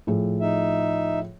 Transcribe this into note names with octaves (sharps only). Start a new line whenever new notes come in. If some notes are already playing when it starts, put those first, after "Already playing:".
A2 F3 G#4
D#4 E5